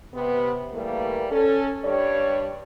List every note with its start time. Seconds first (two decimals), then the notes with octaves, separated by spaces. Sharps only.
0.14 C3 B3
0.72 E3 G3 A3 A#3
1.31 C#4 A4
1.84 G2 G3 D4 C#5